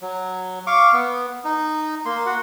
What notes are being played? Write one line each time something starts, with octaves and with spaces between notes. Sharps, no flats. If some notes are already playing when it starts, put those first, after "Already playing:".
F#3
F5 C#6 D6
B3
D#4
A#3 C6
F#4 F#5